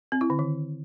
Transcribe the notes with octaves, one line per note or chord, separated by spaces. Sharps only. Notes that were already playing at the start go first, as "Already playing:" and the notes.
C4
E4
D3
D#3